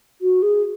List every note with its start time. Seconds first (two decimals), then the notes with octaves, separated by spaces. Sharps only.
0.22 F#4
0.42 G#4